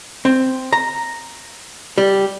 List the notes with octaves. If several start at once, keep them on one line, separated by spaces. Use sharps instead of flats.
C4
A#5
G3